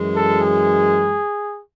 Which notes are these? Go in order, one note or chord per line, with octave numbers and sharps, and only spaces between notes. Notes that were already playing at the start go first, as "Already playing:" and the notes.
Already playing: F#2 E3 G#3
A4
G#4